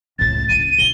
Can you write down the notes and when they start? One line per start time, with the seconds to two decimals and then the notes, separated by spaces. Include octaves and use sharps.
0.19 C#2 A2 A6
0.49 C#2 A#3 D#7
0.79 A#1 G7